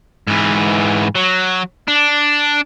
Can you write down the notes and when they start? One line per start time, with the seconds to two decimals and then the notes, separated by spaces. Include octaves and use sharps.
0.27 G#2 E3
1.15 F#3
1.88 D4